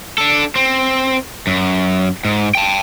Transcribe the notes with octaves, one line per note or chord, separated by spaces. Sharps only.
D4 A4
C4
F#2
G#2
G5 A5